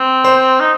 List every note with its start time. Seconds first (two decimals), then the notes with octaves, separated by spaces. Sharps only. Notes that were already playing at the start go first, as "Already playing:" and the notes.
Already playing: C4
0.24 C5
0.60 D#4